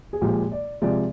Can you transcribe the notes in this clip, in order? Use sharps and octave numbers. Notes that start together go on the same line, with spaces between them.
G#4
A#2 F3 G#3 G4
D5
C3 F3 G#3 D5